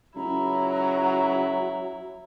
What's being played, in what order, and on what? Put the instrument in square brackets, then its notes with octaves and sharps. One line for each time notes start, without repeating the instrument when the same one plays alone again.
[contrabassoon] C#2 [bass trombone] F#3 [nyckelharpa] E4 [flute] A#5